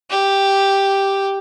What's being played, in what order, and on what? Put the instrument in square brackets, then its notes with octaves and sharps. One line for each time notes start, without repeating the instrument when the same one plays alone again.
[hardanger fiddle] G4